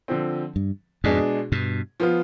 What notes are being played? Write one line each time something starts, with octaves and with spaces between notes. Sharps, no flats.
D3 F3 C4
G2
F2 G#2 B2 G#3 D4 G#4
G2 B2
F3 B3 F4